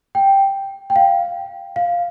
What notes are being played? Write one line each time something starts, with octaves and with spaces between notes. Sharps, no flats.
G5
G5
F5
F5